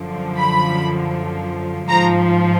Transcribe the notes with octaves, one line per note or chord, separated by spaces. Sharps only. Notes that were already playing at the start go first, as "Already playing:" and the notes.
Already playing: F#2 D3 F3
B5
G#2 F3 A#5